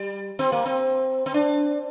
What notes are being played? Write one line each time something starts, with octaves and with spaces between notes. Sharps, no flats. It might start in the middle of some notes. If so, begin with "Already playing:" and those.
Already playing: G3
C4
A#3
C4
C4
D4